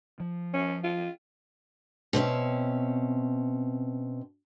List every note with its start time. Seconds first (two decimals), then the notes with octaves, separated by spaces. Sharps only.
0.20 F3
0.54 C#4
0.84 F4
2.13 B2 C4 C#4 E5